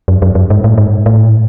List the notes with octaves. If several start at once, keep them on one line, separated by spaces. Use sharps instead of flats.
F#2
F#2
F#2
G#2
A2
G#2
A2